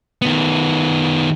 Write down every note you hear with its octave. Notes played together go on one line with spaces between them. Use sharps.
D#3 B3